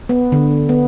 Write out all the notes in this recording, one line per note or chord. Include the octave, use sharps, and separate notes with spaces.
B3
D3
B3